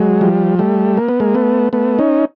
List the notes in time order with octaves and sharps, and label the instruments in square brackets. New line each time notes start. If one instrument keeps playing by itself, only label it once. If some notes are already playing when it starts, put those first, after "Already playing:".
Already playing: [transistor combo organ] F#3 G#3
F3 G3
G3 A3
A#3
B3
G#3 A#3
A3 B3
A3 B3
C#4 D#4